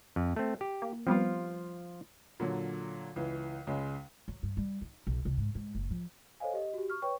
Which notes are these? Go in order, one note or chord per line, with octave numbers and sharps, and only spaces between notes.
F2
A3 C4
G4
A#3
F3 G3 B3 C4 F4
A#2 D3 F#3
C#2 E3
C#2 C#3 G#3
F#3
G2
G3
D#4
B1
C2
G#2
G#2
F#1
F3
A4 C5 C#5 D#5 F5 G#5
G4 D#5
F#4 G4
C#6 F6
B4 C#5 G5 C#6